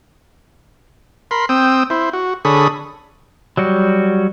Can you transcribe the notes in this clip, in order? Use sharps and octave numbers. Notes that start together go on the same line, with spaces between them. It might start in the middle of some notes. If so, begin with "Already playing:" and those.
A#4 B5 C6
C4 G5 D#6 E6
E4 C5
F#4
D3 G#4 A4 C#5 B5 D#6
F#3 G3 F#4